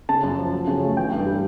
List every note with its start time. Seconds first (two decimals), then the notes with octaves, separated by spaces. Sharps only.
0.09 C#3 A5
0.23 F#2
0.38 F3
0.53 F#3
0.67 C#3
0.82 A3
0.97 E3 G5
1.12 G2
1.26 G3